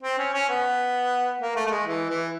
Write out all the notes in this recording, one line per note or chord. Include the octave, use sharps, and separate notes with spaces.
C4
C#4
C#4
B3
A#3
A3
A3
G#3
E3
E3